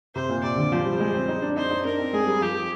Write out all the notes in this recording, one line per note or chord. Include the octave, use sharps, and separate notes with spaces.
C3 C5
A#2
C3 D5
D3
F3 C5
G3
G#3
C4
D#4
D4
D#4 C5
D#4
D4 A#4
C4
G#3 G#4
G3
F3 G4